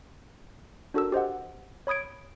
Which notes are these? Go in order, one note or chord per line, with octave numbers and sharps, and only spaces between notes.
D4 F#4 A4 A#4 E6
G4 C5 D#5 F#5
C#5 B5 D#6 G#6 D7